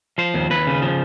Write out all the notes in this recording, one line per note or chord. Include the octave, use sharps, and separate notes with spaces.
F3 C5
D#2
D#2 B4
C#3
F3